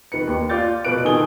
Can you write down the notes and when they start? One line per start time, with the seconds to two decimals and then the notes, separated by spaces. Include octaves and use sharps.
0.12 D#3 B4 C#7
0.27 D#2
0.49 F4 D5 D6 G6 A6
0.85 B2 B4 F#6 D7
1.05 D#3 A4 G#5 D#6 G7